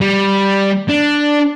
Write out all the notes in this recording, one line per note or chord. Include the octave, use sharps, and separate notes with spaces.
G3
D4